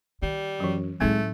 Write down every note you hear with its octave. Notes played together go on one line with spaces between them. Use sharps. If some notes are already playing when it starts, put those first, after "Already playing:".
D#3 G3
F#2 E3 F#3
A2 F#3 G#3 A3 C4 D#4